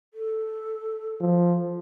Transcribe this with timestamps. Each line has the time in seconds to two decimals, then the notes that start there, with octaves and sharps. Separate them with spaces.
0.14 A4
1.21 F3